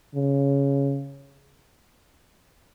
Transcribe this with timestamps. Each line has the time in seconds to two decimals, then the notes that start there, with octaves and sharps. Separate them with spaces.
0.15 C#3